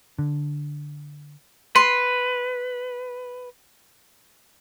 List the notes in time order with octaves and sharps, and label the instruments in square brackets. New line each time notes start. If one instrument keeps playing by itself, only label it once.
[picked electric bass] D3
[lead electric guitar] B4 [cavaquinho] C6